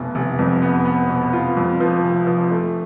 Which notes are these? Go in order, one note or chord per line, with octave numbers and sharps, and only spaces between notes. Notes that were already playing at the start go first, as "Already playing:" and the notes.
Already playing: F1 F2 B2
F1
F2
B3
B3
B2
F4
F2
F3
F1
F3
A3